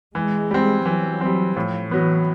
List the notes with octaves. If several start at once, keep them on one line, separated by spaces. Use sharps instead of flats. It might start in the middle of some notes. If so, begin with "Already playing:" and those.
E3 G#3
G3 C4
E3 F#3
G3 C4
A2 F3
E3 F#3 B3